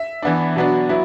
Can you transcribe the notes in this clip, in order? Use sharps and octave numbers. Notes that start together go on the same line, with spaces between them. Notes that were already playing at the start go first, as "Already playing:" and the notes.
Already playing: E5
E3 B3 D4
B2 F#3 B3 D4
F#3 B3 E4